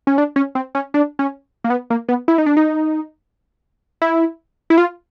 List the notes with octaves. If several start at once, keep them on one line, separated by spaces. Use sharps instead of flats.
C#4
D4
C#4
C4
C#4
D4
C#4
A#3
B3
A#3
B3
E4
D#4
D4
D#4
E4
E4
F4